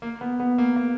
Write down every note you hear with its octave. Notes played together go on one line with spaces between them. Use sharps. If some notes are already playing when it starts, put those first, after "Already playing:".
A#3
B3
B3
A#3
A#3